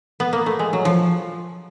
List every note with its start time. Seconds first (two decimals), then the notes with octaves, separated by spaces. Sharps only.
0.20 B3
0.33 A#3
0.46 A3
0.59 G#3
0.73 F#3
0.85 F3